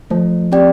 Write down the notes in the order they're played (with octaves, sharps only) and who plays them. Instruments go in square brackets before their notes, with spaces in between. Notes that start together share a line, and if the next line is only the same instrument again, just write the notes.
[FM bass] F3 [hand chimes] A3
[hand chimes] C4 G4 D5 G5